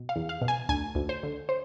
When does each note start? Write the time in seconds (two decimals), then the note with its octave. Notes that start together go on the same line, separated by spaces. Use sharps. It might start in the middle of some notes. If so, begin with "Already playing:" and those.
Already playing: B2
0.09 F5
0.16 E2
0.29 F5
0.42 B2
0.48 G#5
0.69 D2 G#5
0.95 D2
1.09 C5
1.23 D3
1.49 C5